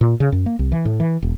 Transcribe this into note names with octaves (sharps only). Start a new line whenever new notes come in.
A#2
C#3
F#2
A#3
C2
E3
A2
E3
E1